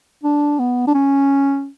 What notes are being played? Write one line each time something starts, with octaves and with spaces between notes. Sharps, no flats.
D4
B3
D4
C#4